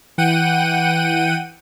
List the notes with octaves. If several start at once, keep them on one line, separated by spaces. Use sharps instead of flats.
E3 F#5 G5 D#7